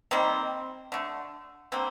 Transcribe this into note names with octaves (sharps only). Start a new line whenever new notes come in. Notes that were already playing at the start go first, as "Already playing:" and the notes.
D#3 G3 A#3 C4
D3 A3
D3 G3 A#3 C4